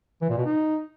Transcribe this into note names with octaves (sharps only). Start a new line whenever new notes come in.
E3
A#2
B2
D#4